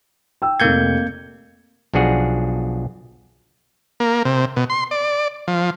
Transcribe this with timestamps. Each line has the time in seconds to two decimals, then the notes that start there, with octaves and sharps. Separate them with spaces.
0.42 G5 E6
0.60 F1 A#3 G6 G#6 C#7
1.94 B1 F3 D4 F#4 G#4 F#5
4.00 A#3
4.25 C3
4.56 B2
4.70 C6
4.91 D5
5.48 F3